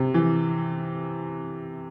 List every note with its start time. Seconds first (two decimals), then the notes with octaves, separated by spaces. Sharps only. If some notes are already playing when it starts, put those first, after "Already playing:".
Already playing: C3
0.14 E3